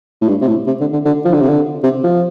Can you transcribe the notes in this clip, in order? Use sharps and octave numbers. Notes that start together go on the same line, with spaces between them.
A2
G2
C3
A2
C3
D3
D3
D3
F3
D3
C3
D3
C3
F3